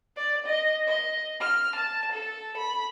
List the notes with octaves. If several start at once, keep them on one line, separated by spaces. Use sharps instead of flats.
D5
D#5
D#5
F6
A5
A4
B5